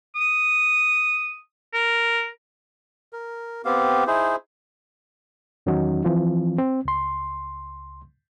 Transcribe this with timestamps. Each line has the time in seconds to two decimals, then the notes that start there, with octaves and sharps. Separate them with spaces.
0.16 D#6
1.74 A#4
3.13 A#4
3.65 B3 C4 G4 F5
4.07 D#4 E4 G#4 C5
5.66 E2 D#3 F#3 C#4 D#4 F#4
6.04 E3 F3 C4 F4
6.58 C4
6.85 C#2 C6